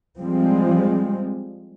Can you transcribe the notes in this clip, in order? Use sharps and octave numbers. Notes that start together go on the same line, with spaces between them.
F3 G3 G#3 C4